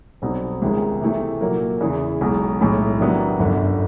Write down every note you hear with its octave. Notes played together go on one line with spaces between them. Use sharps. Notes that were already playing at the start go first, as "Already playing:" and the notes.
B1 B2 G3 C4 D#4
C#2 C3 D#3 G#3 C#4
C3 E3 A3
A#2 F#3 A#3
E2 C#3 E3
B1 B2 G#3
B1 A2 E3 G#3
C3 D#3 F#3 B3 D4
G1 F#2 D3 G3